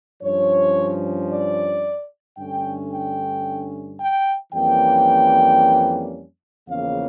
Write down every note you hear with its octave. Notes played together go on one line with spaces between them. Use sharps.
G2 F3 C#4 C#5
D5
G2 D3 A3 C#4 G5
G5
G5
F2 E3 G3 A#3 C#4 G5
E2 C#3 F3 A#3 C#4 F5